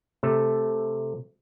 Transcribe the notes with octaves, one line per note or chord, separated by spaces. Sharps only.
C3 A3 A4